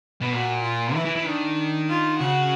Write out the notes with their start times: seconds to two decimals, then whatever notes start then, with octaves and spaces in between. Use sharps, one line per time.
0.21 B2
0.32 A#2 F#4
0.63 F4
0.94 E3 E4
1.05 E3
1.16 E3
1.26 D#3 D4
1.89 F4
2.19 C#3 F#4